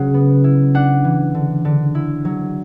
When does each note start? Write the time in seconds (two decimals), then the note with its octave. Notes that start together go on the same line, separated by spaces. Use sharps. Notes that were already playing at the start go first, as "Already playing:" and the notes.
Already playing: C#3 F#3 F#5
0.14 B3
0.44 E4
0.74 D4 F#5
1.04 E3
1.35 D3
1.65 D3
1.95 E4
2.25 F#3